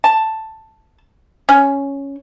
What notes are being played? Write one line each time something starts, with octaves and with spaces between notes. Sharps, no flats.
A5
C#4